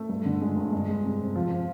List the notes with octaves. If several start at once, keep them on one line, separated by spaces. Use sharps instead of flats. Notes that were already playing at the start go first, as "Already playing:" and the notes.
Already playing: A3
G2
D3
G#3
G2
G#3
G#3
C3
C3
F3
F3